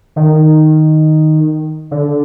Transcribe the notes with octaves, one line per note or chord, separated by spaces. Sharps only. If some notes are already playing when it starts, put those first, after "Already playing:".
D#3
D3